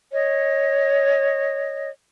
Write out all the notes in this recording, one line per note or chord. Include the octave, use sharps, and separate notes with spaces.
C#5 D#5